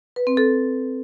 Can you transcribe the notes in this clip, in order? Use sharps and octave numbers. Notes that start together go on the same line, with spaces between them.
B4
C4
A4